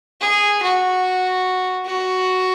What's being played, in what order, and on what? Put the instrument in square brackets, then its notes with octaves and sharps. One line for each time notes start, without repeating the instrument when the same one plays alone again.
[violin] G#4
F#4
F#4